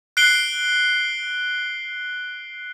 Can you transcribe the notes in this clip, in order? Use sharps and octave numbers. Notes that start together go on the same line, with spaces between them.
F#6 C7 D7 G7